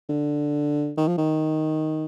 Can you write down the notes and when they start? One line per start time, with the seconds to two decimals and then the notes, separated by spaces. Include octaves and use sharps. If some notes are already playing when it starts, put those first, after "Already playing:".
0.09 D3
0.97 D#3
1.08 F3
1.18 D#3